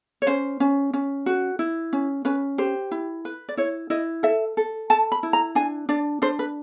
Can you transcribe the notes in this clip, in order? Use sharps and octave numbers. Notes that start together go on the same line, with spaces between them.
C#5
C#4 C5
C#4
C#4
F#4
E4
C#4
C#4 B4
G4 C5
E4
B4
D5
E4 C#5
E4 D#5
A4 E5
A4
A4 A5
B5
E4
A#5
D4 G#5
D4 D5
D4 C5
B4